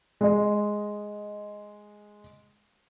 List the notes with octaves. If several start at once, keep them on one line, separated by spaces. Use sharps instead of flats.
G#3 D#5